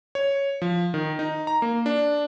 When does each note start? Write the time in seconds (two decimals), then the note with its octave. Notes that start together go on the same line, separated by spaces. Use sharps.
0.15 C#5
0.62 F3
0.94 D#3
1.19 D#4
1.47 A#5
1.62 A#3
1.86 D4